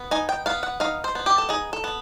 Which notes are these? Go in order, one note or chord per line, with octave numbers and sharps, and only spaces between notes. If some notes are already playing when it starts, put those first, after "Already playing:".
Already playing: B3
D#4 G#5
G5
B3 F5
F#5
D#4 F5
C5
B3
G4
A4
D#4 G#4
A4
B3